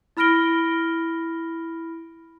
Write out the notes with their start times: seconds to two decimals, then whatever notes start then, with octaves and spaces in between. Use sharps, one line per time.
0.17 E4 B5 F6 A#6 D7 G7